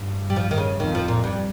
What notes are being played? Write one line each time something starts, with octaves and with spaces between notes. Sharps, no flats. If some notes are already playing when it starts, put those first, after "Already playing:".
Already playing: G2
G3
F3
D#3
C#3
F2 D#3
F3
A#2
G2